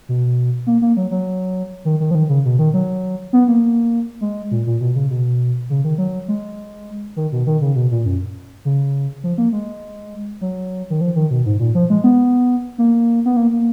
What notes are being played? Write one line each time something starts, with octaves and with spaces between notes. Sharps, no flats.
B2
A#3
A#3
F#3
F#3
D#3
D#3
F3
D#3
C#3
B2
D#3
F#3
B3
A#3
G#3
A#2
A#2
B2
C#3
B2
C#3
D#3
F#3
G#3
D#3
B2
D#3
C#3
B2
A#2
F#2
C#3
F3
A#3
G#3
F#3
D#3
F3
D#3
B2
G#2
A#2
F3
G#3
B3
A#3
B3
A#3
A#3